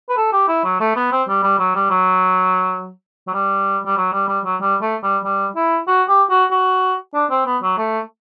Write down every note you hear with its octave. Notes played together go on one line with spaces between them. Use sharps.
B4
A4
G4
E4
F#3
A3
B3
C4
G3
G3
F#3
G3
F#3
F#3
G3
G3
F#3
G3
G3
F#3
G3
A3
G3
G3
E4
F#4
G4
F#4
F#4
D4
C4
B3
F#3
A3